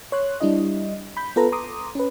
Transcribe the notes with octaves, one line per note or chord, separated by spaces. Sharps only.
C#5 C6 F#6
G3 D4 E4 D#5
B5 G6
B3 F4 A4 B4 A#5
A#5 C6 D6 D#6
C#4 B4